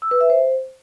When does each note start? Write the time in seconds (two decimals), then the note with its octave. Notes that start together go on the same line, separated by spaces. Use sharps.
0.02 E6
0.11 B4
0.21 E5
0.30 C5